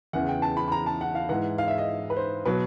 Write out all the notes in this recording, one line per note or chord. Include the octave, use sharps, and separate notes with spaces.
E2 C#3 E3 F#5
G5
A5
B5
B5
A#5
A5
F#5
F5
G#2 E3 F#5
F5
E5
D#5
B4
C5
B2 F#3 B4